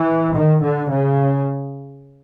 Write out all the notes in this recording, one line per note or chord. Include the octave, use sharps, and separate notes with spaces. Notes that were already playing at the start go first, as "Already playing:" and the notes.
Already playing: E3
D#3
D3
C#3